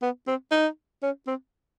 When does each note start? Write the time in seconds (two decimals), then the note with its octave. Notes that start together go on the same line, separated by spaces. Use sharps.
0.02 B3
0.27 C4
0.52 D#4
1.02 C#4
1.27 C4